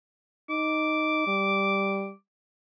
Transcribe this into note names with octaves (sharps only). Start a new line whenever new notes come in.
D#4 D6
G3